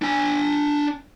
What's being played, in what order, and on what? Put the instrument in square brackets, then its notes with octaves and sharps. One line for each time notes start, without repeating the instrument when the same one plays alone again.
[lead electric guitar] D4 G#5